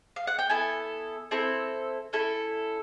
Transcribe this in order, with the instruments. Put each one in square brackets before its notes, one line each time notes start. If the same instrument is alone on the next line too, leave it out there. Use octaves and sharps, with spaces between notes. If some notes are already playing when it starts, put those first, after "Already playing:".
[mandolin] F5
F#5
G5
B3 E4 A4 G#5
C4 E4 A4
C#4 E4 A4